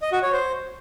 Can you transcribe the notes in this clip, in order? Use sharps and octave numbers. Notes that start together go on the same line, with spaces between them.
D#5
F#4
C#5
C5